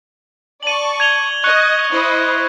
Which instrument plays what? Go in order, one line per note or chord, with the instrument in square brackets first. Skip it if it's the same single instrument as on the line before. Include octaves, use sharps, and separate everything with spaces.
[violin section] D5 A5 C#6 [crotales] D#7 F#7
[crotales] G#6 F7 G7
[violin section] D#5 [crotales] C#6 F#6 C#7
[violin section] E4 C5 D#5